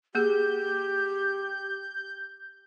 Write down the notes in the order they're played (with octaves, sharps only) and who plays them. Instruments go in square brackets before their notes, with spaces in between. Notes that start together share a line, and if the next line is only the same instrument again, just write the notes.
[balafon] A#3 G#4 [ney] G4 [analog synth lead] G6